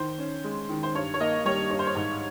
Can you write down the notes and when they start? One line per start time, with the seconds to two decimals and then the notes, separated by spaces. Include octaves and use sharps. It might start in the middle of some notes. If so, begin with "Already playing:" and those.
Already playing: D#3 C5
0.18 C#4
0.44 G#3
0.69 D#3
0.83 C5
0.95 G2 C#5
1.14 C#5
1.20 A#3 D#5
1.45 G3 C#5
1.71 G2 C#5
1.79 C5
1.87 C#5
1.95 G#2